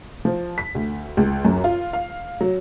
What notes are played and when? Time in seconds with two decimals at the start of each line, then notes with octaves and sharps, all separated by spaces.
0.25 F3
0.58 B6
0.75 D2
1.17 C#2
1.45 F#2
1.64 F4
1.93 F5
2.41 F#3